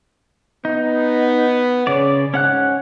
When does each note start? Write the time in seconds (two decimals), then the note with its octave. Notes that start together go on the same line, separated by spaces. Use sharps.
0.65 B3 D#4
1.87 C#3 C#5 D5
2.34 G#2 C#4 F#5 F#6